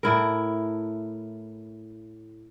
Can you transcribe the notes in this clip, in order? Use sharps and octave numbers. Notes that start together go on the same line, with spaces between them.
A2 E4 A#4